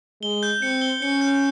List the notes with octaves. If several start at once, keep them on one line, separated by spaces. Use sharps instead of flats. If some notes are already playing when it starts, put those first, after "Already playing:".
G#3 G7
G6
C4 C#7
G7
C#4 C#7
G6